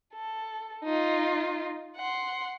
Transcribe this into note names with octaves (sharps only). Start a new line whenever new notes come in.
A4
D#4 F4
F#5 C6